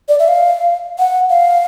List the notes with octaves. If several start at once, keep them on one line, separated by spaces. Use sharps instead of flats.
D5
E5
F5
F#5
F5